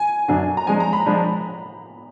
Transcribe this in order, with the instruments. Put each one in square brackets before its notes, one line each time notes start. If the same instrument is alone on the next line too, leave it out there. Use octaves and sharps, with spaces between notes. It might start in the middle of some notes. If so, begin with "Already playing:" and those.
Already playing: [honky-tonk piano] G#5
[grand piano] F#2 D3 F#3 D4
[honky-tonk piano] A#5
[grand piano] F3 G#3 D4 [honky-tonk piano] G#5
[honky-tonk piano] A#5
B5
[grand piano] F3 G#3 D4